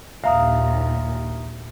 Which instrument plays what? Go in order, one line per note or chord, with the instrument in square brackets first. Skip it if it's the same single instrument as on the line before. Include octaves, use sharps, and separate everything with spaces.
[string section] A#1 D#2 A#2 [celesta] E5 A#5 D#6 [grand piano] F5